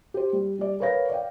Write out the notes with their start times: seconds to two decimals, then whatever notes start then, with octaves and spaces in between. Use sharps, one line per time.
0.14 G4 C5
0.33 G3
0.59 G3 D5
0.80 A#4 B4 C#5 F5 A#6
1.10 D5 F5 G5